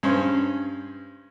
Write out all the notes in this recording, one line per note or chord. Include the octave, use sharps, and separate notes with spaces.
G2 C#4 C5